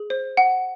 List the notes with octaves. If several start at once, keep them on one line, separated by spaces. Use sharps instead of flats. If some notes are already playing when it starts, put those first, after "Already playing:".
Already playing: G#4
C5
F#5